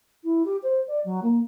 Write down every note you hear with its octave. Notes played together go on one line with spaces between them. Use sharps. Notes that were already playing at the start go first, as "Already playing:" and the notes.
E4
G4
C5
D5
F#3
A#3